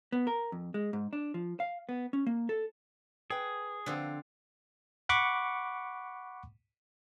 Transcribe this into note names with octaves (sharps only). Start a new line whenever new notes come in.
B3
A#4
F2
G#3
G#2
D4
F3
F5
B3
C#4
A#3
A4
G#4 B4 G5
D3 F3 C4 F5
F#5 B5 C#6 D6